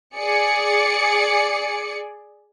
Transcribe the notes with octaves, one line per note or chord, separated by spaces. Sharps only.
G#4 D5 C#7